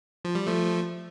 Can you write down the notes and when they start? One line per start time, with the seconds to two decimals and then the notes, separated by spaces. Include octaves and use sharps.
0.25 F3
0.35 G3
0.47 F3 A3